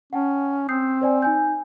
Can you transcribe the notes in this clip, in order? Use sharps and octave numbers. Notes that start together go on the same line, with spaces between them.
C#4 F#5 G5 A5
C4 D#6 G6 C7
C5 D5 G#5
D#4 G#5 G6